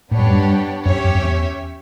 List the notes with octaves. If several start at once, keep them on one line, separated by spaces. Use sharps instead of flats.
A2 B3 D4 G4 C#5
G2
F#2
G2
F#2 C#4 G4 C#5 E5
F#2
F#2
E2